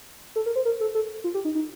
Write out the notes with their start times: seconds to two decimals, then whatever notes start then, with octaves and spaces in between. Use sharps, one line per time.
0.36 A4
0.46 A#4
0.56 C5
0.65 A#4
0.81 A4
0.95 A4
1.24 F4
1.34 G4
1.45 D#4
1.55 D#4